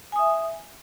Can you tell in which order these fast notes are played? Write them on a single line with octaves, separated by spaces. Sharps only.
G#5 D#6 E5